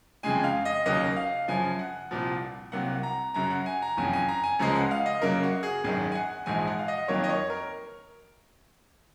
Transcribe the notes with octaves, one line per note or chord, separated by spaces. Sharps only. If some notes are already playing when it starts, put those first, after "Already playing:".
F2 C#3 G#3 G#5
F5
D#5
D#2 C#3 F#3 A#3 D#5
F5
F#2 C#3 F3 G#5
F#5
C2 A#2 F3
C2 C3 F#3 A#3 F#5
A#5
F#2 C#3 F#3 A#5
F#5
G#5
A#5
F#1 F2 C#3 G#5
G#5
A#5
G#5
C#2 C#3 F3 G#3 A#5
F#5
F5
D#5
F#2 C#3 F#3 A#3 A#4
F#4
G#4
G#1 F#2 D#3 G#4
G#5
F#5
A#1 G#2 F3 G#3 G#5
F#5
F5
D#5
F2 D#3 F#3 A#3 C#5
D#5
C#5
A#4